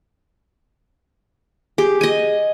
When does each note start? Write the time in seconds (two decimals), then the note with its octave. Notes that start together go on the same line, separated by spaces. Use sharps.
1.78 G4 G#4
2.01 D#5 G#5